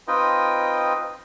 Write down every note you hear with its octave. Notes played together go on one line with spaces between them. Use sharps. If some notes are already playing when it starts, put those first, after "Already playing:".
C4 D#4 F4 B4 D#5 G5